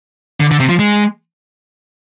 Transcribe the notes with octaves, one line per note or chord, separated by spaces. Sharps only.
D3
D3
C3
F3
G#3